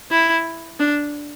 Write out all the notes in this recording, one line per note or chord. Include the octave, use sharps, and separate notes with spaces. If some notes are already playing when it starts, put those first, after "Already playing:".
E4
D4